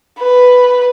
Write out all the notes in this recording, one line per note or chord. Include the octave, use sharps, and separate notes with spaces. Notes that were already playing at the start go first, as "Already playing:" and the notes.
B4